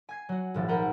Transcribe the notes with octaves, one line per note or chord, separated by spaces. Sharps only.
G#5 G#6 C7
F#3 F#4
D#1 G#1 F3 A6
A#4 C5 F#5 G#5 A#5 B5